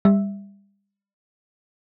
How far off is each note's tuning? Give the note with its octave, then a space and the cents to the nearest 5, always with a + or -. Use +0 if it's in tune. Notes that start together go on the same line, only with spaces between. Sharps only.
G3 +30 E5 +0